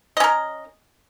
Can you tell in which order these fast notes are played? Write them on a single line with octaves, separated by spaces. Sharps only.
D#5 C#4 A#4